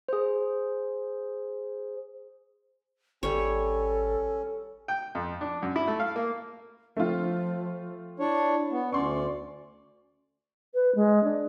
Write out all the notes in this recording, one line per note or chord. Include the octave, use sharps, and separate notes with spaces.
G#4 C5
G#1 G3 C#4 A4 C#5
G5
F2
D4
F#2
E4
A3
F5
A#3
F3 A3 C4 F4
D4 E4 C#5
B3
D2 C#4 D5 C6 C#6
B4
G#3
D4